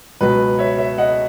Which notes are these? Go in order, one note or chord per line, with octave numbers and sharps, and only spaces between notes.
C#2 B2 F#3 B4
C#5 E5
C#5 E5
D#5 F#5